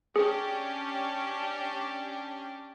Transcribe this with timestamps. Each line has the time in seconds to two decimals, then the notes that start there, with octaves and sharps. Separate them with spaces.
0.16 C#4 D4 G4 G#4